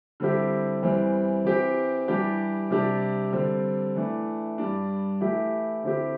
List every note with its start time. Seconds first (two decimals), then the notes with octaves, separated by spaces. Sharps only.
0.20 D3 G3 C4 E4 G4
0.83 E2 E3 G3 C4
1.45 E3 C4 G4
2.08 E3 G3 D4 G4
2.70 C3 G3 D4 G4
3.33 D3 G3 C4
3.96 E3 A3 D4
4.58 G2 G3 D4
5.21 E3 A3 E4 G4
5.84 D3 C4 E4 G4